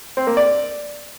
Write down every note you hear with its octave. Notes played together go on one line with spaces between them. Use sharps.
C4
A#3
D5